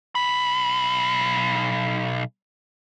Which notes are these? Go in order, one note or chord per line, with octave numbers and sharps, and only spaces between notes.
B1 B5